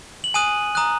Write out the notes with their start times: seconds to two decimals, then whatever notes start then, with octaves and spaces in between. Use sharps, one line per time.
0.24 F#7
0.34 G#5 D#6 F#6 D#7
0.75 A#5 D#6 F#6